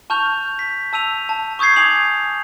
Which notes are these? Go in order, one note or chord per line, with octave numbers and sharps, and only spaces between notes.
A5 C#6 F6 G6 F7
B6
A5 E6 D#7 F7
A5
C#6 D#6 G6 G#6 C7
G#5 D6 G#6 F7 F#7